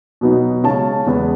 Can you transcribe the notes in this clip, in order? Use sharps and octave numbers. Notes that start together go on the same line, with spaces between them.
B2 F#3 B3 D#4
C#3 G#3 C#4 A5
E2 C#3 G#3 B3